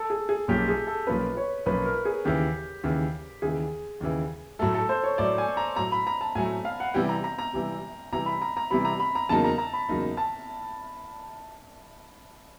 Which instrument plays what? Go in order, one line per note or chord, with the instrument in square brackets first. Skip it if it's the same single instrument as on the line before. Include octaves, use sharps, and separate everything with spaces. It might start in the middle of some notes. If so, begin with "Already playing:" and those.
Already playing: [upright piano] A4
G#4
G#4
[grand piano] B1 A#2 F3 A#3 C#4 [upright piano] G4
[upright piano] G#4
A4
[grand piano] B1 A#2 F3 A#3 C#4 [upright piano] B4
[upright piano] C#5
[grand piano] B1 A#2 F3 A#3 C#4 [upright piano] B4
[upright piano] A#4
G#4
[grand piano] D#2 C#3 E3 [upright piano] G4
[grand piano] D#2 C#3 E3
[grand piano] D#2 C#3 E3 [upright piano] G#4
[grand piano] D#2 C#3 E3
[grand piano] A2 F#3 A3 [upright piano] A4
[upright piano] A4
C5
C#5
[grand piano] A2 F#3 A3 [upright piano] D5
[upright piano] G#5
A#5
[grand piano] A2 F#3 A3 [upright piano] A#5
[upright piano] B5
A#5
A5
[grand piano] A2 F#3 A3 [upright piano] G#5
[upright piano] F5
F#5
[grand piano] C3 E3 G3 [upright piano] G5
[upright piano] A#5
A#5
A#5
[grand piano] C3 E3 G3
[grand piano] C3 E3 G3 [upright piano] A#5
[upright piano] B5
A#5
A#5
[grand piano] C3 E3 G3 [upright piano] B5
[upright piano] A#5
B5
A#5
[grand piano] E2 C#3 F#3 A#3 D#4 [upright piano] A5
[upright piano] A#5
A#5
B5
[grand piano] E2 C#3 F#3 A#3 D#4
[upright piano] A5